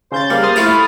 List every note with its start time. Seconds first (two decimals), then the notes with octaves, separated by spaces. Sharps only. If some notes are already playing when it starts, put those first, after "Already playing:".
0.12 C#3 C5 G6 A6
0.30 G3 A#3 F5
0.43 C5 D#6 F6 A6
0.56 A3 E4 F4 A5
0.68 B5